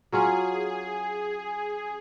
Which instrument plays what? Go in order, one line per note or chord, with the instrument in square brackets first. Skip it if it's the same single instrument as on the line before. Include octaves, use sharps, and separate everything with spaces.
[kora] F#3 C#4 F4 [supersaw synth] G#4